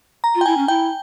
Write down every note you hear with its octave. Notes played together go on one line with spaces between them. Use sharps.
A#5
F4
G5
E4 G#5
C#4
E4 G5